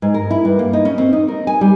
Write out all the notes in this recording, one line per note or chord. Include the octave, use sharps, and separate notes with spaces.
G#2
A#4
E4
G2
A#3
D#4
C#4
C4
D#4
A#4
G#5
G3